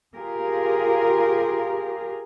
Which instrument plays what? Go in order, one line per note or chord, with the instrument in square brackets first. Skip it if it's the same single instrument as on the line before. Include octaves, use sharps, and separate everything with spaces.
[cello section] F4 G4 G#4 A#4